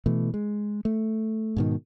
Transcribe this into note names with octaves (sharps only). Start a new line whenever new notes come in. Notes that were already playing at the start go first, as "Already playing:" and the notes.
B2 E3 A3
G#3
A3
G#2 B2 D#3